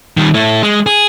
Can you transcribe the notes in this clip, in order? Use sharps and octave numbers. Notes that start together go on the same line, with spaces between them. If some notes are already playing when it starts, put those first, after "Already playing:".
D#3 G3
A3 E4
G#3
G#4